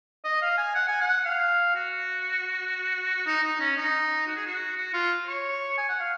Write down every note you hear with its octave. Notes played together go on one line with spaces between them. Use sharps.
D#5
F5
G#5
F#5
G#5
F#5
F5
F#4
D#4
D#4
C#4
D#4
F#4
G#4
F#4
F#4
F4
C#5
G#5
F#5
F5